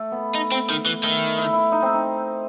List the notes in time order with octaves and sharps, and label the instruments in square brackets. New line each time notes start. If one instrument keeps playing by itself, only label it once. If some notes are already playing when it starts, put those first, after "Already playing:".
Already playing: [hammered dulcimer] A3
B3
[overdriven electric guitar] D#4
C4
D#3
E3
[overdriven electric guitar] D#3 [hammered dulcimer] A3
[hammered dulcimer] E4
E4
D#4
C4
D#4